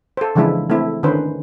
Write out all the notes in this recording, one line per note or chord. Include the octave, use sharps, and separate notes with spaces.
A4 C5
C#3 E3 F3 G#3 D4 E4
A3 C4 E4
D3 D#3 C#4 B4 C5